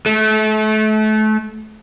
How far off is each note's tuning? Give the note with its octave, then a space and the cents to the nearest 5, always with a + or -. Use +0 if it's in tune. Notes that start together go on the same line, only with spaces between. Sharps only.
A3 -30